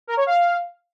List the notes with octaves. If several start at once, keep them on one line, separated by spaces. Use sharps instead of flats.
A#4
C#5
F5